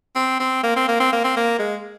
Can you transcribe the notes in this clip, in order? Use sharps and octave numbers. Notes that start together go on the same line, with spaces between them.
C4
C4
A#3
C4
A#3
C4
A#3
C4
A#3
G#3